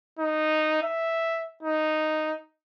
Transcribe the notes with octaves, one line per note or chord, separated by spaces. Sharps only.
D#4
E5
D#4